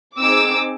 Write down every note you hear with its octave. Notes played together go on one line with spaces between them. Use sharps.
C4 D#4 G#4 D6 E6